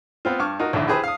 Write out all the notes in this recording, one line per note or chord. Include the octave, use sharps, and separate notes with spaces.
B3 C4 F4
G2 C#6 D6 F6
D#4 F4 F#4 A#4
A#1 D#2 G#2 D3 E4
E4 G4 G#4 B4 C5
F5 D#6